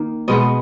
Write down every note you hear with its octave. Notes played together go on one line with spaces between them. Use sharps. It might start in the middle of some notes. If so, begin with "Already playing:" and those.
Already playing: D#3 A#3
B2 G#3 B3 D#5